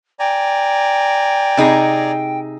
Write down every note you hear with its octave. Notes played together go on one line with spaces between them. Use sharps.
D5 G5 G#5 A#5
C3 D#4 G#4